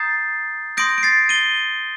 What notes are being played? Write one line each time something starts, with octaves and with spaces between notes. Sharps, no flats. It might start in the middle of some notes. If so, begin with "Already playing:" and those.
Already playing: A#5 D#6 G6 A6 C7
C6 D#6 G6 A#6 D7
D7
A6 C7
D#7 G7